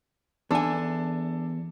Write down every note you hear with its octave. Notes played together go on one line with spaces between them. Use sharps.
E2 D4 A4 G#5